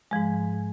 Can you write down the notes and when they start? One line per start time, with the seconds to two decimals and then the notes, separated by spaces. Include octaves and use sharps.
0.11 G#2 F3 G#3